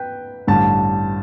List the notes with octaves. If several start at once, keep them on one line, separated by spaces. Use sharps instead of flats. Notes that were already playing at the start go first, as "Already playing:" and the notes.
Already playing: B4 G5
A1 G2 D3 A5